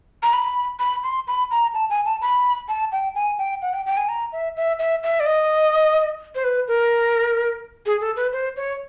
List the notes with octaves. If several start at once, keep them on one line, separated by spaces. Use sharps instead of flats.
A#5
B5
B5
C6
B5
A#5
A5
G#5
A5
B5
A5
G5
G#5
G5
F#5
G5
G5
G#5
A#5
E5
E5
E5
E5
D5
D#5
C5
B4
A#4
G#4
A4
B4
C5
C#5